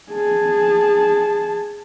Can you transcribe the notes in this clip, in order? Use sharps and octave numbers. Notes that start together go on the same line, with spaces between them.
G#4 A5